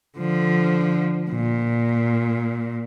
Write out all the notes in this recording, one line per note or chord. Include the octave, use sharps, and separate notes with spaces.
D3 F3
A#2